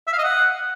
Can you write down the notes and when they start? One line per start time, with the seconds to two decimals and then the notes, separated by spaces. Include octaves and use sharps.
0.07 E5
0.13 F5
0.19 D#5
0.24 F#5